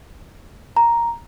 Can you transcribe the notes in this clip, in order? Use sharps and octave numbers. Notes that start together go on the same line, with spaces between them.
A#5